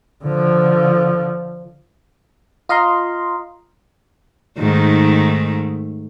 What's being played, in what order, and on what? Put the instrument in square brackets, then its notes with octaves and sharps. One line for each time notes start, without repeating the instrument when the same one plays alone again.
[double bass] D3 F3
[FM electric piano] F4 D#5 F5 A#5 C6
[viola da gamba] G#2 D#3 A3